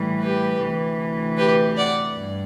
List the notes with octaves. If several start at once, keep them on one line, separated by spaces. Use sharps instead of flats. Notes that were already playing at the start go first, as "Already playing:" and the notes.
Already playing: A2 E3 G3
G4 B4
D2 C3 E3
G4 B4
D5 F#5
G2